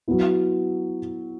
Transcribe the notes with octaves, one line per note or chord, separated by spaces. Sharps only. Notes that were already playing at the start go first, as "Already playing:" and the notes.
F#3 B3 E4